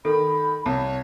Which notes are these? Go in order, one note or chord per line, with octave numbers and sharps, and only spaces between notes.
D#3 A4 B5
C2 C#5 A5